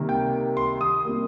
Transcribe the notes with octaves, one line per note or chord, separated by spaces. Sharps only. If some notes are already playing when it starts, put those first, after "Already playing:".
Already playing: C3 D#3 G3 A#3
G5
C6
D#6
C3 G3 A#3